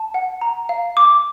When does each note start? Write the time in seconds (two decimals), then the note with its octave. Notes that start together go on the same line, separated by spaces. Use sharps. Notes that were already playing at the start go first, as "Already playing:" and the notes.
Already playing: A5
0.14 F#5
0.41 A#5
0.69 F5
0.97 D6